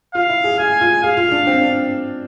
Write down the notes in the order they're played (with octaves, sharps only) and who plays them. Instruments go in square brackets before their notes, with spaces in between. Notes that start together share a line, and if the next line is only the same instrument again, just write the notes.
[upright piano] F4 [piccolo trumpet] F5
[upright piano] E4
G#4
[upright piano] G#4 [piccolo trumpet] G#5
[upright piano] F4
[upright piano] G#4 [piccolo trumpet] F5
[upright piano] F4
D4
C4
D4